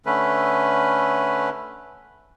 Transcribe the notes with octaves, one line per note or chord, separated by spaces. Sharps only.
D3 A3 C#4 B4